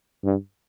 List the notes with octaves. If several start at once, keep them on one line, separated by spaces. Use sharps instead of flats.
G2